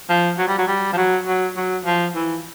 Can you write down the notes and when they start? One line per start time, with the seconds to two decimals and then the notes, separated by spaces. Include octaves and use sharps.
0.10 F3
0.38 F#3
0.48 G3
0.58 F#3
0.68 G3
0.93 F3
0.97 F#3
1.27 F#3
1.57 F#3
1.85 F3
2.15 E3